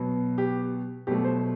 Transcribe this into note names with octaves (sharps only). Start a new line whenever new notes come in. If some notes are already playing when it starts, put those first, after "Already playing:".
Already playing: B2 F#3 B3
G4
B2 F#3 A3 G4
C5